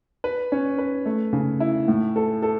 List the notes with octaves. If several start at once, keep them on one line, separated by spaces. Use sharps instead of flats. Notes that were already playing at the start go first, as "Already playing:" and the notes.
B4
C#4
B4
A3
C#3
E4
A2
A4
A4